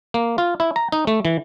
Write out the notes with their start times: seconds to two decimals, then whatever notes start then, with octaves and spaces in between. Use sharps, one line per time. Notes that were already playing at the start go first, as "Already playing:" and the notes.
0.14 A#3
0.38 F4
0.60 E4
0.76 A#5
0.92 D#4
1.07 A3
1.25 E3